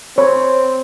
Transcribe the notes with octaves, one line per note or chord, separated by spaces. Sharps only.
C4 C#5 B5